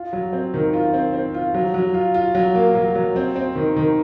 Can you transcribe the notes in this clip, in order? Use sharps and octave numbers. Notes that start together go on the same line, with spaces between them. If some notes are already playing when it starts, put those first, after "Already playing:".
Already playing: F4
F#3
C4
D#3
F4
C4
C4
F4
F#3
F#3
F4
F4
F#3
A#3
F#3
F#3
C4
C4
D#3
D#3